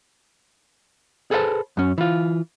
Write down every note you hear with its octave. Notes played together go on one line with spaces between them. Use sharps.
G#4 A4 B4 C5 E5 A5
F#2 C#4
E3 F4